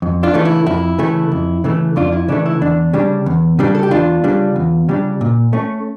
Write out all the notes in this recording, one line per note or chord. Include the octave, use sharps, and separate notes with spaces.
F2
D4 F4
C#3 E3 A3
E4
F2 E4
C#3 E3 A3
F2
C#3 E3 A3
F2 D4 F4
E4
C#3 E3 A3 D4
E4
E2 D4
C#3 G3 D4
E2
C#3 G3 D4
A4
G4
E2 D4 F4
C#3 G3 D4
E2
C#3 G3 D4
A#2
A3 C#4